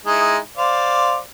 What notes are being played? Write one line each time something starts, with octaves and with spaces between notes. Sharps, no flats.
G#3 D#4 E4
C5 D5 F5